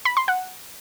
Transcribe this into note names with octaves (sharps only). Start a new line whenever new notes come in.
B5
C6
F#5